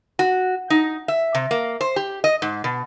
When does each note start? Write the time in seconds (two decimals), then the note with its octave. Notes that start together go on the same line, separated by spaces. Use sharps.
0.19 F#4
0.70 D#4
1.08 E5
1.35 C3
1.51 A#3
1.81 C5
1.96 G4
2.24 D#5
2.42 G#2
2.64 B2